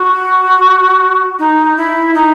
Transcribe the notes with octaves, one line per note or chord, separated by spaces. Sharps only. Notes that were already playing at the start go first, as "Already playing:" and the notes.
Already playing: F#4
D#4
E4
D#4